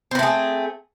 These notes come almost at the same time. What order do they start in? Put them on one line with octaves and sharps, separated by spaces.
C4 B4 A3 G#4